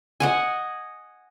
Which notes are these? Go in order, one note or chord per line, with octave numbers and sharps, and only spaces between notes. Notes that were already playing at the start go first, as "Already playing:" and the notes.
D#5 F#5 G#5